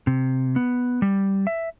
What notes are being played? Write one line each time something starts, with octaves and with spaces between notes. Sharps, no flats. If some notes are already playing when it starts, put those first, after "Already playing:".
C3
B3
G3
E5